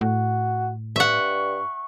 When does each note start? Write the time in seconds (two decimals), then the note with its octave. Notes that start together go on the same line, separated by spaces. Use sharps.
0.01 A2 F#4
0.96 G2 E5 F#5 C#6